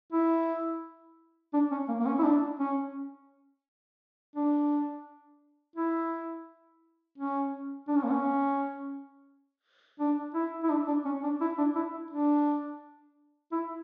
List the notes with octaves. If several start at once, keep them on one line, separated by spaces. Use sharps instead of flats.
E4
D4
C#4
A#3
A#3
C#4
E4
D4
C#4
D4
E4
C#4
D4
C#4
A#3
C#4
D4
E4
E4
D4
D4
C#4
D4
E4
D4
E4
D4
E4